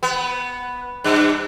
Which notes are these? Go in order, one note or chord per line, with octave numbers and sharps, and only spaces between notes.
B3
G2